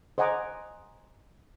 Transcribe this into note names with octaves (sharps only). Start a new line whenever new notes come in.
C5 D#5 F#5 G#5 A#5 D6